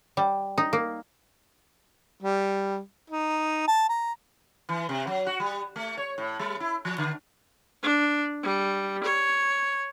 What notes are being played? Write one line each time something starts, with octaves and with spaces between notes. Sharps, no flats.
G3
D#4
A#3
G3
D#4
A5
A#5
E3
C3
F#3
F#4
G3
A3
C#5
A2
G3
E4
F3
D3
D4
G3
C#5